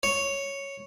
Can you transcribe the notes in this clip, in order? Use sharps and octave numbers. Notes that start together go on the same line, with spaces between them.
C#5